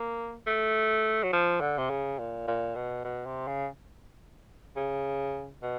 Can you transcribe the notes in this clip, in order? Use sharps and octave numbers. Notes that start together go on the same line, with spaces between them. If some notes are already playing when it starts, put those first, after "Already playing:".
Already playing: A#3
A3
F#3
F3
D3
C3
C#3
A#2
A#2
B2
B2
C3
C#3
C#3
B2